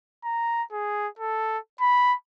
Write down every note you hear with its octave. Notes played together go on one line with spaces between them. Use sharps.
A#5
G#4
A4
B5